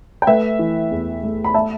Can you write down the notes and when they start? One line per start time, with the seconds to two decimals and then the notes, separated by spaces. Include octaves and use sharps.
0.22 G5
0.27 A3 B4 E5
0.59 E3
0.91 E2
1.23 A3
1.44 B5
1.54 A3 E5 A5